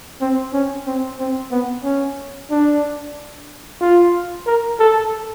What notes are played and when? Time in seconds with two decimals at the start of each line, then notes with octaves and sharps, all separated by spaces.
0.21 C4
0.53 C#4
0.86 C4
1.19 C4
1.51 B3
1.84 C#4
2.51 D4
3.81 F4
4.47 A#4
4.80 A4